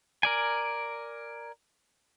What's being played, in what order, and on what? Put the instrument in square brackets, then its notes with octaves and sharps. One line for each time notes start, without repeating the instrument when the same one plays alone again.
[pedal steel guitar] A#4 D5 G#5